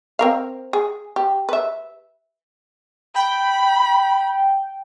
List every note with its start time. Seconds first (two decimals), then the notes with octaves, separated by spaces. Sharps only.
0.19 C4 A#4 F5
0.73 G#4
1.16 G4
1.49 B4 E5
3.15 G5 B5